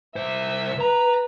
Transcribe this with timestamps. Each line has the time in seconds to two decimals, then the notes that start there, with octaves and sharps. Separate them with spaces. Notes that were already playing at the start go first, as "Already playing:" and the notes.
0.16 C2 C5 E5
0.81 B4 A#5